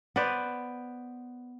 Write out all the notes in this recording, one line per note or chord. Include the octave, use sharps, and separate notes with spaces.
B3 B4 C5 D5